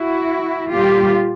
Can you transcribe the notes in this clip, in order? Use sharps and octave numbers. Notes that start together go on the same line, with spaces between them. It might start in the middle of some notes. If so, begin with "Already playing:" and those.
Already playing: E4 F#4
A#2 G3 F4 G4